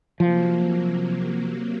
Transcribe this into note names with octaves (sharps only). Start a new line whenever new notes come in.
C3 F3 F#3 A#3